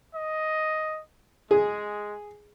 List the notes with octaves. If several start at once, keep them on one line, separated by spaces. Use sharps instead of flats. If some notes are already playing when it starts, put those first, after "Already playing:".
D#5
G#3 G#4